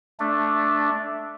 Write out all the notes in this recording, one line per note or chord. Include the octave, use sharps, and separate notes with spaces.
A3 D4